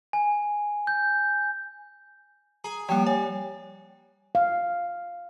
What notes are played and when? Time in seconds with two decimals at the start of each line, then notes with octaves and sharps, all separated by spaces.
0.13 G#5
0.87 G6
2.64 G#4 A#5
2.89 F3 G3 A#3 G5
3.06 C#5 G#5
4.35 F5